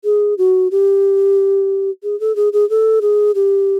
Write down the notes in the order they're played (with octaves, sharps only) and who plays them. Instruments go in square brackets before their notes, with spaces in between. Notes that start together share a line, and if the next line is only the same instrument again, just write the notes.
[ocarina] G#4
F#4
G4
G#4
A4
G#4
G#4
A4
G#4
G4